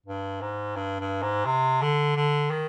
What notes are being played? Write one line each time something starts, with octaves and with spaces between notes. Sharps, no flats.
G2
G#2
G2
G2
G#2
C3
D3
D3
D#3